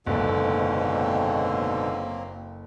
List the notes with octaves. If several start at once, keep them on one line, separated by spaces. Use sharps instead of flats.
F#1 G#2 B2 D3 F#3 A3 A#3 C4